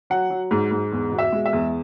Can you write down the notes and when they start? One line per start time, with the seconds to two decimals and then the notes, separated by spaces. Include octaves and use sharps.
0.10 F#3 F#5
0.30 F#3
0.51 G#2
0.71 G#2
0.92 E2
1.12 B2
1.19 E5
1.33 G#3
1.46 E5
1.53 E2